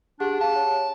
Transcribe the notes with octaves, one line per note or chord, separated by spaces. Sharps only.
D4 G4 G#4 F#5
G#4 F5 A5
C#5